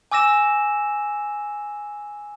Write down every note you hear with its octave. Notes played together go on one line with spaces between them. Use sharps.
G#5 D6 E6 A#6 E7